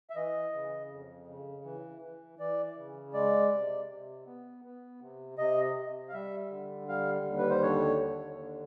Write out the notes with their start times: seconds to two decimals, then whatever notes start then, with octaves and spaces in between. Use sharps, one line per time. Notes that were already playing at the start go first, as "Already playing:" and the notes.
0.10 E5
0.15 E3 D#5
0.53 C#3
0.89 F2
1.27 C#3
1.65 E3
2.02 E3
2.39 E3 D5
2.77 C#3
3.14 G#3 D5
3.52 C3
3.89 C3
4.26 B3
4.64 B3
5.01 C3
5.38 C3 D#5
5.76 C3
6.09 F5
6.13 G3 E5
6.50 D3
6.88 G3 F5
7.25 D#2
7.38 B4
7.50 C5
7.62 D3 C#5
8.00 D#2
8.38 D3